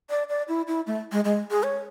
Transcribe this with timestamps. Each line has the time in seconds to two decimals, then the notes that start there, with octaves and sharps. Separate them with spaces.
0.10 D5
0.29 D5
0.48 E4
0.68 E4
0.87 A3
1.12 G#3
1.24 G#3
1.51 G#4
1.63 C#5